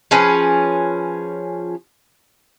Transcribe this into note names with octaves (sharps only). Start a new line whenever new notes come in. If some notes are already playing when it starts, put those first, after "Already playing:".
F3 C#4 G#4 B4